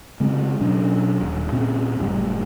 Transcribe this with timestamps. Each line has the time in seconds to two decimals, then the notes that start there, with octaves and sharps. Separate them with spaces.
0.20 C#3 G#3 C4
0.60 B2 F#3 C#4 D4
1.20 D#1
1.52 A#2 C4 C#4
1.99 F#1 A2 C#3 G3